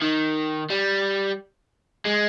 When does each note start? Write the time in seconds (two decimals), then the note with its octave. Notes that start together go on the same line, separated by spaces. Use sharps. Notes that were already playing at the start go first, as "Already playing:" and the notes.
0.02 D#3
0.70 G3
2.05 G#3